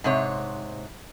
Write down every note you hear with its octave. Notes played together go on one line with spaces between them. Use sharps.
G#2 C3 C#5